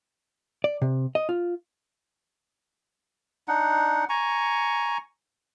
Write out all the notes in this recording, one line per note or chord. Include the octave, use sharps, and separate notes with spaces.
D5
C3
D#5
F4
D4 D#4 F#5
G#5 A#5 C#6